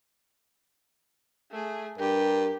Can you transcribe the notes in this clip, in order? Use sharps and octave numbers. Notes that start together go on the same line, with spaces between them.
A3 G#4
G2 G4 A#4